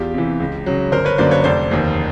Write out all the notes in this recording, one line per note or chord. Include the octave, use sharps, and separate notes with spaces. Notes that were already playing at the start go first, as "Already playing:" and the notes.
Already playing: E2 F4 G4
C3 E3
C#2
C#3 F#3
G1 A#4 C5
B4 C#5
F#2 D3 F#3 A#3 C5 D5
B4 C#5
F1 C5 D5
D#2 D#3